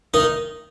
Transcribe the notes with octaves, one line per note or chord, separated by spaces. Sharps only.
D#3 D#4